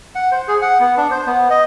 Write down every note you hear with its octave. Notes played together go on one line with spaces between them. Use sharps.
F#5
C5
G#4
F#5
B3
D4
C5
B3
D#5